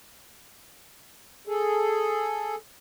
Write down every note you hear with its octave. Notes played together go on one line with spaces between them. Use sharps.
G#4 A4